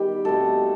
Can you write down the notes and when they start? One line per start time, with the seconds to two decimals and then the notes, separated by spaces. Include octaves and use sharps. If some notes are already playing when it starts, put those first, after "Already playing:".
Already playing: D#3 G3 B3 G4
0.25 B2 A3 C4 A4